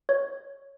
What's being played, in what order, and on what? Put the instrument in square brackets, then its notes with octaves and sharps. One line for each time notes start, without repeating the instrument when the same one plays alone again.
[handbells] C#5